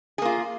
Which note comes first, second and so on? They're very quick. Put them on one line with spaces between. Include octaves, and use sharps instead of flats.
G#4 A#3 F4